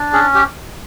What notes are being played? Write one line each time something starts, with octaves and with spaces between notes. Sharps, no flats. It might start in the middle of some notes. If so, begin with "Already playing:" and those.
Already playing: D4
C#4 G#4
G4